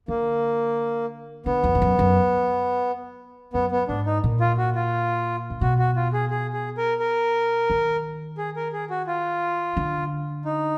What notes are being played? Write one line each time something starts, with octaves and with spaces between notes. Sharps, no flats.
D3 A#3
D3 B3
F2
G#2
F#2
F#2
F#2 B3
B3
G#2 D4
D#4
A#2
F4
F#4
F4
D3
B2 F#4
F#4
F4
G#4
G#4
G#4
A#4
A#4
D#3
G#4
A#4
G#4
F#4
F4
D3
D#4